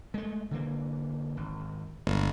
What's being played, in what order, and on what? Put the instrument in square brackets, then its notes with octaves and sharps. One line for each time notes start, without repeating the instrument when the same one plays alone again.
[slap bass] G#3 A3
D3 E3 A#3
G#1
[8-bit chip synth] G1 [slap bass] D2 G#3